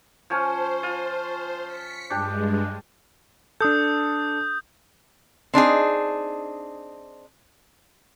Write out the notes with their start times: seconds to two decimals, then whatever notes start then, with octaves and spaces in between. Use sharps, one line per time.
0.30 F3 C#4 C5
0.83 F4
1.64 B6 C#7
2.10 G2 G#3 D4 G4
3.61 D4 A4 D#6 G6
5.54 C4 D4 D#4 G#4